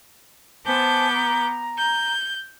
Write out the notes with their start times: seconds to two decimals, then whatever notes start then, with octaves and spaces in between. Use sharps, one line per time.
0.66 B3 C5 G#5 A5 D6 G6
1.14 A#5
1.77 G6